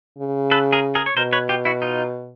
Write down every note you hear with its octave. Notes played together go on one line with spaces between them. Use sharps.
C#3
A4 B4
G#4 A#4
G#4 A#4
C#5
B2 A#4 C5
B4 C#5
F4 G4
E4 F#4
D#4 F4